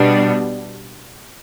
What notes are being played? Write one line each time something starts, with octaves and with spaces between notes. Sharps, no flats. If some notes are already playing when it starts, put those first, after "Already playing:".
Already playing: B2 G3 D4